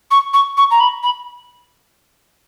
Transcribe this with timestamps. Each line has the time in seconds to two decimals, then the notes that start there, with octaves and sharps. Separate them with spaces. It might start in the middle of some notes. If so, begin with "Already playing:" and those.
0.11 C#6
0.33 C#6
0.57 C#6
0.71 A#5
0.80 B5
1.03 B5